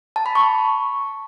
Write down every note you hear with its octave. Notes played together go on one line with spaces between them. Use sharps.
A5
B5
C#6